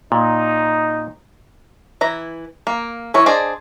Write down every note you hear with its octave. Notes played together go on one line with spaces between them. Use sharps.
A#2 D#4
E3 E4 A#5
A#3
E3 E4 A#4 C#5
D4 G#4 C5 D5 D#5